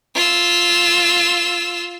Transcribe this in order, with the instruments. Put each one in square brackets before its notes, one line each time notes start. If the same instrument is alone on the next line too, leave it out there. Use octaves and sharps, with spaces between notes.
[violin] F4 E6